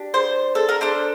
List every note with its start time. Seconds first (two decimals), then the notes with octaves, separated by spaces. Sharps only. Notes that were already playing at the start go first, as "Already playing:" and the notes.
Already playing: D4 G4
0.14 C5
0.55 A4
0.69 A#4
0.81 D4 A4 C5